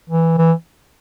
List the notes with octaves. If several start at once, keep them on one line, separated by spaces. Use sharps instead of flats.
E3
E3